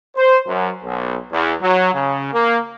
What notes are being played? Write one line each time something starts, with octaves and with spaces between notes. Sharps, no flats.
C5
F#2
B1
E2
F#3
C#3
A#3